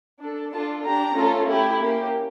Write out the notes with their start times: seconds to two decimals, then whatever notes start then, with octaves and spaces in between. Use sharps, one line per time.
0.21 D4 A4
0.53 D4 F4 A4 A5
0.84 D4 G4 A#5
1.16 A3 C#4 F4 A4
1.48 A3 E4 G4
1.80 A#3 C#4 G4